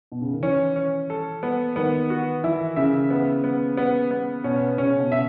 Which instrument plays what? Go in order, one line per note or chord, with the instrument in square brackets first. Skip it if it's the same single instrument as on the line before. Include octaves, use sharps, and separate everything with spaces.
[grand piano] B2
C#3
D#3
[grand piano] E3 [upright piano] C#4
[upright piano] C#4
A4
B3
[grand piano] D#3 [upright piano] B3
[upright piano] F#4
[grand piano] E3 [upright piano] E4
[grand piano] C#3 [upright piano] E5
[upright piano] B3
B3
B3
B3
[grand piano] B2 [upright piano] C#4
[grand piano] C#3 [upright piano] C#4
[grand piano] B2
[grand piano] C#3 [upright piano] E5